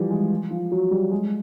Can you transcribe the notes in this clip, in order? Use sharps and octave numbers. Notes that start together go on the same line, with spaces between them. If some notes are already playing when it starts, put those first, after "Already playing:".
Already playing: E3 F3 G3
G#3
F3
F#3
G3
G#3